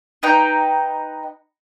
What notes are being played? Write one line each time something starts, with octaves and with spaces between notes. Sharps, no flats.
D#4 B4 G5